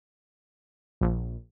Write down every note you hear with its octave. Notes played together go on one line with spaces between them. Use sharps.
A#1